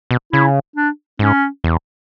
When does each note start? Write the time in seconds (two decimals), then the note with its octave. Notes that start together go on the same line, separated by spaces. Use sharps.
0.11 B2
0.32 C#3 E4
0.76 D4
1.19 G#2 C#4
1.64 E2